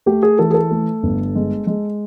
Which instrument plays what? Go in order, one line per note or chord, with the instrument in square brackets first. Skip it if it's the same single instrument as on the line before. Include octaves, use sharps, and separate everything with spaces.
[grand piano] A3 G4
G#4
E3 A4
G#4
A4
A3
G1
G#3
G#3